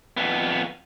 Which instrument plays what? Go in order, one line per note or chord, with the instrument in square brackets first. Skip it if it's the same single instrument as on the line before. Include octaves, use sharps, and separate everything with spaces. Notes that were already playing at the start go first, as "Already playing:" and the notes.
[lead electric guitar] F2 B3